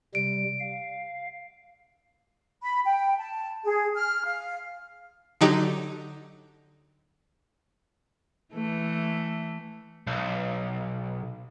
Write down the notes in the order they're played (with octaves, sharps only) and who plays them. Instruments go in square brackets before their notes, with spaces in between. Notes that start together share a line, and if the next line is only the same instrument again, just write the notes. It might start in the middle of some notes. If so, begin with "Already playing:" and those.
[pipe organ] C3 G3 [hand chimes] D7
[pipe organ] F5
[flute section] B5
G5
A5
G#4
F6
F5
[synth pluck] D3 F#3 D#4 G4
[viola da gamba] E3 A3
[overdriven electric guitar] B1